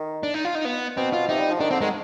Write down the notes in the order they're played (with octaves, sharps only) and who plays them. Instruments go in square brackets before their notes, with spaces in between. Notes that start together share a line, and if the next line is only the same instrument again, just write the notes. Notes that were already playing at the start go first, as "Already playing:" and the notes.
Already playing: [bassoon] D#3
[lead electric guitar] D4
D#4
F4
D#4
B3
[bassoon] B2 [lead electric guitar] C4
[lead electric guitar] F4
[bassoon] C3 [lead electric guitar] D#4
[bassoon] G3
F3
[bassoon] D#3 [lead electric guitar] D4
[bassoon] D3 [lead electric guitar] C4
[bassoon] D#3 [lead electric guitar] G#3